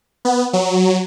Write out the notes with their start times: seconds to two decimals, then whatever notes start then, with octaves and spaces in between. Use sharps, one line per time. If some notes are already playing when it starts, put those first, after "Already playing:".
0.25 B3
0.53 F#3